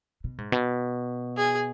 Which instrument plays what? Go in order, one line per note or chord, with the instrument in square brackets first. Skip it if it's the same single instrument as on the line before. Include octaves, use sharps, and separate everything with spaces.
[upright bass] B2
G#2
B2
[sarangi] G#4